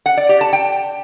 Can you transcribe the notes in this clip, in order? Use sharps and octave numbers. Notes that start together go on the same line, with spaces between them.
F#5
D5
G4
A5
G5